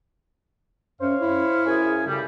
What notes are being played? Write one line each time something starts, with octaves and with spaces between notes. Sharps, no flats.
F#2 C5 C#5 F5
E4
F#2 G#4 G#5
A2 C#3 G3